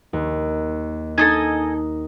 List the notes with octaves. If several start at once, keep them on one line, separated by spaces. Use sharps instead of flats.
D#2
D#4 A4 D#5 G#5